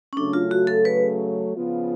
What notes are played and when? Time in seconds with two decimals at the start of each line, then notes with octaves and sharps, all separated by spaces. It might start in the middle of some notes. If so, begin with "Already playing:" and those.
0.13 C#4
0.16 C#3 F#3 A3 D4
0.33 F4
0.51 F#4
0.67 A4
0.85 B4
1.53 C#3 F3 B3 F4